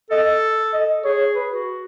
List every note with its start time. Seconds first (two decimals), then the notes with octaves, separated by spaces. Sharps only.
0.10 A4 D#5
0.74 D#5
1.04 G#4 C#5
1.35 B4
1.51 F#4